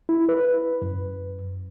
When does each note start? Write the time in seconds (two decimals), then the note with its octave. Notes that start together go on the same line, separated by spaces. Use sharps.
0.09 E4
0.29 B4
0.82 F#2